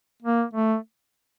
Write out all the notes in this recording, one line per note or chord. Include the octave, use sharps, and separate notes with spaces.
A#3
A3